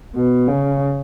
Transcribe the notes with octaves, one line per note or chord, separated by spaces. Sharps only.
B2
C#3